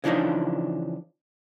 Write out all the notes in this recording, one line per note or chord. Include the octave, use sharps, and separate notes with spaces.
C#3 E3 F3 D4 D#4